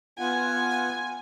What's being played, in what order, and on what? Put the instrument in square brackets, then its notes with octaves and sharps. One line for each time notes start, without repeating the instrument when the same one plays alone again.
[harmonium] B3 F4 F#5 [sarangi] G#5